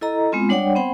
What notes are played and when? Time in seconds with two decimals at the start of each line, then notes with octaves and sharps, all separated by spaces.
0.01 E4 A4 D#5 A#5
0.32 G#3 B3 C4 F4
0.49 G3 D4 C#5 D5 F#5 G5
0.75 B3 C4 C5 F#5 G5 B5